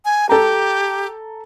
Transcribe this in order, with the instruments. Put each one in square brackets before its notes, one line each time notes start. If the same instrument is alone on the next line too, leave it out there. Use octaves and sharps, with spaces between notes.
[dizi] G#5
[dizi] G4 [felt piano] A4 A#5